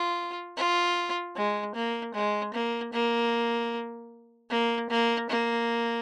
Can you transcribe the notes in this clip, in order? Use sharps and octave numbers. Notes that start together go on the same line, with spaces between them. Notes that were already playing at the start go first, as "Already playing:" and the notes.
Already playing: F4
F4
G#3
A#3
G#3
A#3
A#3
A#3
A#3
A#3